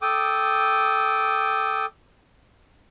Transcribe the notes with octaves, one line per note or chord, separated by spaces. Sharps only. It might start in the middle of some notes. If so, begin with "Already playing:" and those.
A4 G5 D6 D#6